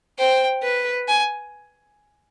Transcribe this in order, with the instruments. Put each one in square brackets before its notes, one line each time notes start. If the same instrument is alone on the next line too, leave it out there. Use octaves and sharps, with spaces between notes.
[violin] C5 [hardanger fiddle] G5
[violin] B4
[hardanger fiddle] G#5